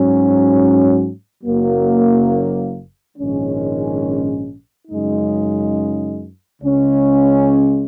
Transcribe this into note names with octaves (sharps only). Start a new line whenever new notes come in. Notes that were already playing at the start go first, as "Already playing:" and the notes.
Already playing: G#2 F#3 C#4
F#1 F#2 F#3 A#3
A#1 G#2 D#3 G#3 C#4
F#2 C#3 G#3 D#4
C#2 C#3 G#3 C#4